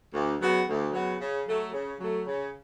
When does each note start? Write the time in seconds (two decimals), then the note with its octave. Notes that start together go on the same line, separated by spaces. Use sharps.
0.13 D2
0.40 C#3 F#3 B3 F#4
0.67 D2
0.93 C#3 F#3 B3 F#4
1.20 C#3
1.47 F#3 A3
1.72 C#3
2.00 F#3 A3
2.26 C#3